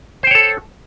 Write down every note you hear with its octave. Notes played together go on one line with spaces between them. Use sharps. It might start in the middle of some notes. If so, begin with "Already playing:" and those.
A4 C5 C#5 G5